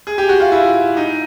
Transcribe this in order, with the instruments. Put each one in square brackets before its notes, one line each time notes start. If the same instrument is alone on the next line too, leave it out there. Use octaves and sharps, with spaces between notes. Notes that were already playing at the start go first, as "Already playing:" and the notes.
[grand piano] G#4
G4
F#4
F4
E4
D#4